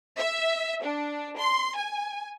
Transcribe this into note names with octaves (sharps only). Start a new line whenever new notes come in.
E5
D4
C6
G#5